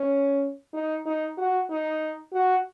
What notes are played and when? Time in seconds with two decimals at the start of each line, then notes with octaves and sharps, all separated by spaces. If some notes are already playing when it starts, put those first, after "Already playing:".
Already playing: C#4
0.73 D#4
1.06 D#4
1.38 F#4
1.70 D#4
2.33 F#4